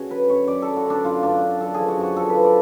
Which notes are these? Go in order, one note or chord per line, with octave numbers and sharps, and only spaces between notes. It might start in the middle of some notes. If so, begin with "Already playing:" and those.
Already playing: D3 C#4 F#4 G#4
F#3 B4
F#2 C#5
F#2 D5
A4
F#3
F#4
D3 D4
F#2 F4
F#2 D4
D3
F#2 A4
F3 G#4
F#4
F#2
F#4
F3 A4
B4
F3
D5